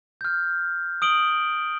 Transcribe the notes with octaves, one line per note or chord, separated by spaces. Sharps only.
F6 G6
D#6 D7 F#7 G7